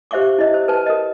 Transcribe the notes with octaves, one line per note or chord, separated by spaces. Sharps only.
G4 C5 E5 F5 C#6 D6
E4 D#5 E5
C5
B4 A5
A#4 D#5